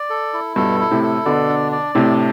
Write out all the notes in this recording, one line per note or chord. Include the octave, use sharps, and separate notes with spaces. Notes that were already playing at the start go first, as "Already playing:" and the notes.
Already playing: D5
A4
E4
G2 B2 A4
E4
A2 C3
A4
B2 D3 D5
D4
D5
A2 C3 D4